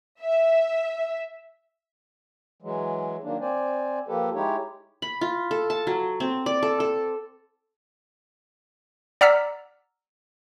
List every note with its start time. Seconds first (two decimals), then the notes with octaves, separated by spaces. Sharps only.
0.21 E5
2.62 E3 F#3 G#3
3.23 D#3 F#3 A#3 D4
3.41 C4 C5 D5 G#5
4.08 F3 A#3 G4 A4 B4
4.34 G#3 D#4 E4 G4 C#5
5.02 B5
5.21 F4
5.51 A4
5.70 A5
5.87 F#3
6.20 C4
6.46 D5
6.63 A4
6.80 A4
9.21 D5 F#5 A#5 E6 F6 B6